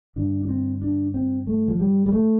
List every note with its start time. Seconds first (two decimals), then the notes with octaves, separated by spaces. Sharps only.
0.16 G2 D3 D4
0.43 D4
0.49 C4
0.82 D4
1.14 C4
1.47 A3
1.68 F3
1.80 G3
2.06 G3
2.12 A3